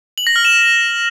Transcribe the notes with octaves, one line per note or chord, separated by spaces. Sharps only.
F#7
A#6
F6
E7